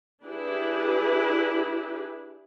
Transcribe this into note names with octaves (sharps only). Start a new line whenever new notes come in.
D4 E4 G4 G#4 B4